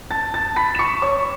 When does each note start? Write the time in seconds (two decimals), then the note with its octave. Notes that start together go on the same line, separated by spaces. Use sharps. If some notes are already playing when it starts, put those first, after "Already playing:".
0.11 A5 A6
0.34 A5 A6
0.56 B5 B6
0.75 E7
0.79 C#6 C#7
1.02 C#5 C#6